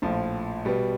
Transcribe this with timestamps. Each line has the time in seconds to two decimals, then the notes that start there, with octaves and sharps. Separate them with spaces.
0.02 A#1 A2 F3
0.65 B2 G3 B3